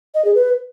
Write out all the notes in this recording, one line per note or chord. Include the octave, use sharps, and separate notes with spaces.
D#5
G#4
B4